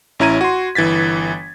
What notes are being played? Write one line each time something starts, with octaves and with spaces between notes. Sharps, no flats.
A1 C#4 E4 A#5 G#6 D#7
F#4 C6
G1 E3 G#6 A6 B6